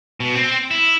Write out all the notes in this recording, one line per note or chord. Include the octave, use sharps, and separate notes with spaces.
B2
C4
E4